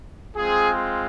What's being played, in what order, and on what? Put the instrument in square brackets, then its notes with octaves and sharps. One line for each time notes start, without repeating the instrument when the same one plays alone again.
[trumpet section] G#3 C4 F4 G#4